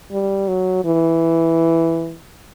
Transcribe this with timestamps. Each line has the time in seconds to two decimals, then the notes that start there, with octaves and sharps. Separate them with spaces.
0.11 G3
0.48 F#3
0.84 E3